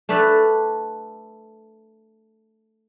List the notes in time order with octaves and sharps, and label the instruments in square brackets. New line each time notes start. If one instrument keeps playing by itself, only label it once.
[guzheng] A3 D4 A4 B4